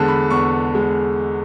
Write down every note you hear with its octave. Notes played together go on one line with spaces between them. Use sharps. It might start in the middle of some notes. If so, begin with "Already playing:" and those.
Already playing: E2 D3 G#3 A5
B5
E2 C#6
G#3